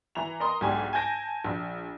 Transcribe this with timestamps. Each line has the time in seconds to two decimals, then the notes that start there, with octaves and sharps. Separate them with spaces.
0.15 E3 A#5 F7
0.40 A#4 D#5 A#5 C6 D#6
0.61 B1 G#2 D4 G4 G#5
0.93 G#5 A5 G6 A#6 D7
1.45 A#1